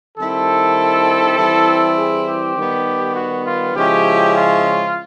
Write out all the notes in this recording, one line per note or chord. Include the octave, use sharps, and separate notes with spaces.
D#3 G3 C4 E4 A4
E3 G3 C4 E4
G#4
G4
D#3 G3 B3
F#4
F4
C#3 F3 G#3 C#4 E4 G4
F4